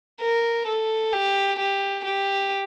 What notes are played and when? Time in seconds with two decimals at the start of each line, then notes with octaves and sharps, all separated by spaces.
0.21 A#4
0.68 A4
1.13 G4
1.59 G4
2.05 G4